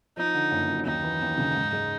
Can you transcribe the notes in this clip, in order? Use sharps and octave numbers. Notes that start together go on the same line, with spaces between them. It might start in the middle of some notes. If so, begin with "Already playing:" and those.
F3 D#4
D3
F#1
F#2
D#2 D#4
E3
D#2
C#3
G#2
G#3